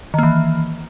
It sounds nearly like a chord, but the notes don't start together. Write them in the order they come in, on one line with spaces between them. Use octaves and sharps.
D#3 A#3 E3